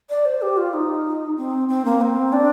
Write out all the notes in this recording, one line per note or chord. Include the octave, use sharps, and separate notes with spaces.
D5
C5
G4
F4
D#4
C4
C4
A#3
C4
D4